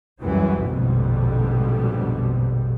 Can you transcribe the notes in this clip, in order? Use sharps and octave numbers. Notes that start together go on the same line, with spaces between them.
C#2 F#2 E3 F#3 G3
A#1 F2 G#2 B2 D3 G3